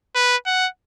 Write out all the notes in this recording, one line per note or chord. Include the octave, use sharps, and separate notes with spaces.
B4
F#5